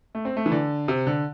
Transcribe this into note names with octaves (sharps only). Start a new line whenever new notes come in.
A3
C4
A3
E3
D3
C3
D3